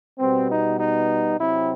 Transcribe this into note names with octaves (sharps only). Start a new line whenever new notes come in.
B2 G3 B3 C4
D#4
D#4
C3 F#3 C4 E4